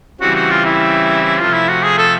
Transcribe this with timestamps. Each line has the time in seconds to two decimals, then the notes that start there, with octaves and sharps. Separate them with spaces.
0.20 C#3 E3 G3 C4 F#4
0.36 F#4
0.51 F4
0.66 E4
1.39 C3 F3 A3 F4
1.54 E4
1.69 F#4
1.84 G#4
1.98 A4